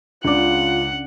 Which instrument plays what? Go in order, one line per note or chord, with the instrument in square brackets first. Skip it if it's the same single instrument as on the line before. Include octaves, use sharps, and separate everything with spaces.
[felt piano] C#2 D6 [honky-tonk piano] C#3 D4 [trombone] F4 [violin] F#5